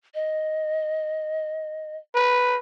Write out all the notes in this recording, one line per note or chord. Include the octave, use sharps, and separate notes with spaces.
D#5
B4